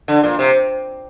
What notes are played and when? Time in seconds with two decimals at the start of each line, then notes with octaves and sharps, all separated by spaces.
0.08 D3
0.23 A#2
0.39 C3